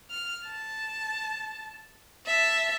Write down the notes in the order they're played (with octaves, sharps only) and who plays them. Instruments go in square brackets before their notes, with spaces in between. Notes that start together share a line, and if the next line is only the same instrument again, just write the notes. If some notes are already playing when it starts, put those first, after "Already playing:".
[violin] F6
A5
E5 A5